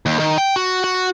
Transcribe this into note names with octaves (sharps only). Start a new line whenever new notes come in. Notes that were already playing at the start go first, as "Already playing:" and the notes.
D#2
D#3
G5
F#4
F#4